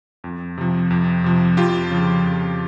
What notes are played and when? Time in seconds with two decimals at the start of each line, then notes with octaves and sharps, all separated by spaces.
0.24 F2
0.58 C3 F3
0.90 F2
1.24 C3 F3
1.57 F2 F4 G4
1.91 C#3 F3
2.24 F2